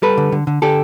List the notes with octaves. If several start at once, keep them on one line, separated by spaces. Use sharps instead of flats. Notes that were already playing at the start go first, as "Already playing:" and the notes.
G3 A4 B4
D3
D3
D3
D3 G4 A4